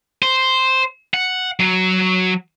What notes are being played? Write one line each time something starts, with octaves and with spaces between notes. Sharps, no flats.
C5
F#5
F#3